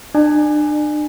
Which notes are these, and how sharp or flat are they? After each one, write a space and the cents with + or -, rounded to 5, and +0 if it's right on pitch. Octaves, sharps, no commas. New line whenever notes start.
D4 +35 G#5 +0